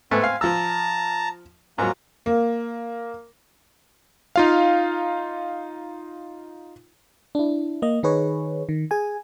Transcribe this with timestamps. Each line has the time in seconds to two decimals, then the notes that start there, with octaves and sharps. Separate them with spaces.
0.11 G#2 A3 B3 C4 G#5
0.24 F5
0.41 F3 A5 A#5 E6
1.78 G#2 F#3 A#3 F4 A#5
2.26 A#3
4.36 D#4 F4 F5
7.35 D4 E4
7.82 A#3 D#5
8.03 D#3 D#4 G#4 B4 C#5
8.69 D#3
8.91 G#4 G#5